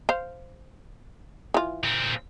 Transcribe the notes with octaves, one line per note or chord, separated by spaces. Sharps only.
C5 F5
E3 F4
A#2 C4